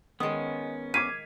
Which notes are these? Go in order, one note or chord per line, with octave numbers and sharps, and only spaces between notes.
D#3 G#3 B3 C#4 D#6
F5 D6 G#6 B6 D#7